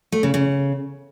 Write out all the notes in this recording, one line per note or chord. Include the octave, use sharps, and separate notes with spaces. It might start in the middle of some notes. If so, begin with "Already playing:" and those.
A3
C#3
C#3